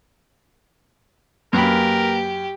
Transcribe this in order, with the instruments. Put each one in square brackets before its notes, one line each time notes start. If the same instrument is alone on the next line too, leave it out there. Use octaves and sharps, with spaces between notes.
[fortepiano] F#2 B5 [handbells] A#3 B4 [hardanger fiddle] G4 [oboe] A#4